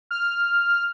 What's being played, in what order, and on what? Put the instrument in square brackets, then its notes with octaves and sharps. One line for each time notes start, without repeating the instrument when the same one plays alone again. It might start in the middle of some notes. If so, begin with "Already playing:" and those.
[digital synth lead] F6